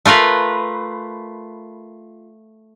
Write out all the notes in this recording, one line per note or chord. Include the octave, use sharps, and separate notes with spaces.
A3 F4 A#4 B4